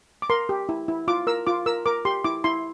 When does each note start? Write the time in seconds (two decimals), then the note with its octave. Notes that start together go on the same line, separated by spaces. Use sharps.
0.22 D6
0.30 A#4 C6
0.49 G4
0.69 E4
0.88 E4
1.08 F4 D6
1.27 A#4 E6
1.47 F4 D6
1.66 A#4 E6
1.86 A#4 D6
2.05 G4 C6
2.24 E4 D6
2.44 E4 C6